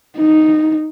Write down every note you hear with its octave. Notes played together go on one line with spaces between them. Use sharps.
D#4